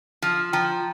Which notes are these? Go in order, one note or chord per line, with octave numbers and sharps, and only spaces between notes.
F3
F3 G5 A#5